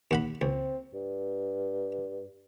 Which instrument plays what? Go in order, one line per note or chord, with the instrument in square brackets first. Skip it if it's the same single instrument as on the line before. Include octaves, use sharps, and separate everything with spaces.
[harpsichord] D#2 F#5 B5
[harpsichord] C#2 [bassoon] C4
[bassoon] G2